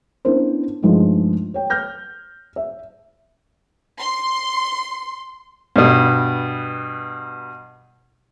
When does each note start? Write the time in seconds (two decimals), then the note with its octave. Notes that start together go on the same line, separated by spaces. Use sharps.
0.25 B3 C#4 D4 E4 A#4 C5
0.83 G2 F3 G#3 A3 D#4
1.54 C#5 G5
1.70 F6 G6 A#6
2.56 E5
4.01 C6
5.76 G2 B2